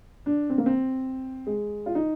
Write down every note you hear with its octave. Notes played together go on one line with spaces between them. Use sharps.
D4
C4
A#3
C4
G#3
F4
D#4